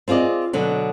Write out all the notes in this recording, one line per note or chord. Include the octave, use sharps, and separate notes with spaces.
C4 F4 G#4 D5 D#5
B2 D3 F#3